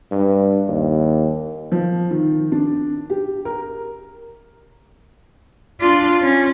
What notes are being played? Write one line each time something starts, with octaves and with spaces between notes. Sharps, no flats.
G2
D#2
F3
D#3
D4
G4
A#4
D4 F4
C#4